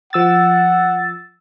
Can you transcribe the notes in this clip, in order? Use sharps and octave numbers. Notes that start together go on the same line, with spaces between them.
F3 F#5 E6 A6